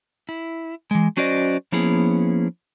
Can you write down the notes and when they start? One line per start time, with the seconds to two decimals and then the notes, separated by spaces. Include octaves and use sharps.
0.29 E4
0.91 E3 G#3
1.17 F#3 C#4 F#4 C5 D5 D#5
1.72 F3 A#3 B3 C#4 E4 G#4